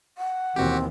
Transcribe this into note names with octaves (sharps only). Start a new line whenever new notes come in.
F#5
D#2 B2 E3 C4 F#4 G4